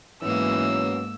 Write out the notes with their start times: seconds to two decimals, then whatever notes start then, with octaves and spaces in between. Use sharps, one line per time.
0.22 G#2 E3 F#3 A#3 B3 C#4 E6